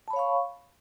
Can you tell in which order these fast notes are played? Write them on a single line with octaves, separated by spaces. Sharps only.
A5 B5 C#5 F5 C#6